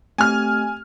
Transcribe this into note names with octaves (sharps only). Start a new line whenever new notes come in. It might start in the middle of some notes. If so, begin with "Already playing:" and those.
A3 C4 G4 G#5 F6